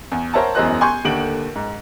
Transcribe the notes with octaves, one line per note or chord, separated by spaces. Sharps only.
E2
A#4 C5 C#5 E5 F#5 A5
E1 F#2 E3 C5 D#5 F#6
G#5 C6 C#6 G6
D#2 D3 A3 D7 F#7
G#2